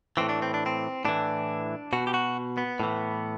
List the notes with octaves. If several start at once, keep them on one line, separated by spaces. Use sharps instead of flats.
A2 E3 C4
D4
C4
D4
C4
A2 E3 D4
B2 F#4
G4
F#4
B3
A2 E3